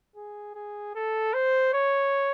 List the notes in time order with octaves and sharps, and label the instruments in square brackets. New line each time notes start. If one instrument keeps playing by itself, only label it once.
[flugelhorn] G#4
G#4
A4
C5
C#5